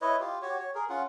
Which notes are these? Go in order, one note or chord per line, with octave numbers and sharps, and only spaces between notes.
E4 B4 C#5 D#5
F4 G4
F#4 G4 C#5
C#5
G#4 A#4
C#4 F4 F#5